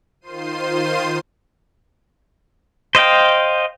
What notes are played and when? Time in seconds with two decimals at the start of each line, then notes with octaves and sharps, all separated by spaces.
0.21 D#3 F4 C5 C6 C7 D#7
2.95 C5 D#5 F5 G5